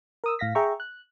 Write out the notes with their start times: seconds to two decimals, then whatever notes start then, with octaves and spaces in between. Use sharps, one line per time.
0.24 A#4 D#6 E6
0.39 A2 F5 A#6 B6
0.55 G#4 E5 G5 A#5 C#6
0.80 F#6